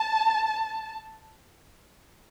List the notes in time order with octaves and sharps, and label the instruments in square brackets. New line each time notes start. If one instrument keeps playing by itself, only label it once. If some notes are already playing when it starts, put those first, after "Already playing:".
Already playing: [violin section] A5